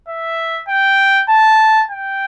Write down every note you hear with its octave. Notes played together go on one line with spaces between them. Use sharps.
E5
G5
A5
G5